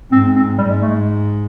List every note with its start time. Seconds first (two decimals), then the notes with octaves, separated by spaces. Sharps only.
0.12 G#2 C4
0.36 C4
0.58 G#2 G3
0.70 G#3
0.82 A3
0.89 G#3